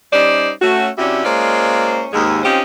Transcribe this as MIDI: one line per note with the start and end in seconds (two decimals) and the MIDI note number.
0.13 0.51 55
0.13 0.51 61
0.13 0.51 63
0.13 0.51 72
0.13 0.51 74
0.62 0.89 57
0.62 0.89 61
0.62 0.89 66
0.98 1.23 48
0.98 1.23 61
0.98 1.23 62
0.98 1.23 64
0.98 1.23 66
0.98 1.23 67
1.25 2.07 56
1.25 2.07 58
1.25 2.07 61
1.25 2.07 65
1.25 2.07 72
1.25 2.07 74
2.13 2.42 39
2.13 2.42 44
2.13 2.42 56
2.44 2.63 60
2.44 2.63 61
2.44 2.63 63
2.44 2.63 65
2.44 2.63 67
2.44 2.63 72